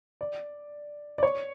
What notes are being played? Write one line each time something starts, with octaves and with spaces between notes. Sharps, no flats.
D5
D5
C#5